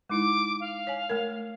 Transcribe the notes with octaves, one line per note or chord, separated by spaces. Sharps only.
G#3 D#4 E4 D6
F5
C#5 G#5
A3 A#4